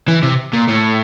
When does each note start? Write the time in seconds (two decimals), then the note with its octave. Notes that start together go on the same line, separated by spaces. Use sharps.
0.08 E3
0.23 C3
0.53 A#2
0.68 A2